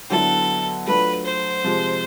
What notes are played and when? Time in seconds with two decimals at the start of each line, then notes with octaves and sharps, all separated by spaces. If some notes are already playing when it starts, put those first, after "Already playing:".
0.10 D3 F#3 B3 E4 A4
0.87 F#3 A3 D4 F4 B4
1.25 C5
1.64 C3 F3 G#3